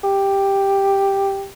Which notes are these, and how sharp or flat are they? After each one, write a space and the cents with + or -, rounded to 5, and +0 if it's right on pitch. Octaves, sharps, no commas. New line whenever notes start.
G4 +5